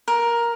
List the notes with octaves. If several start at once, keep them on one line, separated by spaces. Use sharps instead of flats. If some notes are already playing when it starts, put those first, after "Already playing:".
A#4